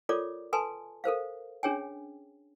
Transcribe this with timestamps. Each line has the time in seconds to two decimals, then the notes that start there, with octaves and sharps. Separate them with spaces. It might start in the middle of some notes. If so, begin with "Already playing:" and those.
0.09 F4 A4 A#4 C#5 D5 D6
0.53 A4 B4 G#5 A5 C6
1.04 A4 A#4 C5 F5
1.63 C#4 D4 G#4 C#5 G5 G#5